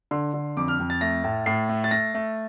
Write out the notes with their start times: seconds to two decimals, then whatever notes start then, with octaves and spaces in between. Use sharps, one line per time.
0.11 D3 C6
0.34 D3
0.57 F2 D6
0.68 F6
0.79 F2
0.90 A6
1.01 A3 A#6
1.24 A2
1.46 A2 C7
1.69 A3
1.84 A6
1.91 A3 A#6
2.14 A3